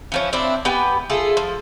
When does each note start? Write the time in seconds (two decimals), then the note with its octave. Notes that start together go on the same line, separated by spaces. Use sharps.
0.12 E3 F3 C#4
0.33 C4 D4 E4
0.65 B3 G4 B4 G#5
1.10 E4 F4 G#4 A4
1.37 F3